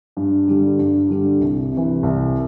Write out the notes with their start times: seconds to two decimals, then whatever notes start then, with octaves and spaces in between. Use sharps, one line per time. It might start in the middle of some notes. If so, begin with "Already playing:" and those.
0.17 G2
0.48 D3 G3
0.79 G2
1.09 D3 G3
1.41 C2
1.72 C3
1.77 E3
2.03 C2